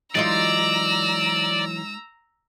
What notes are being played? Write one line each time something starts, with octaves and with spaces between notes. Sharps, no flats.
E3 F#3 G#3 D#4 F4 D5 A#5 E6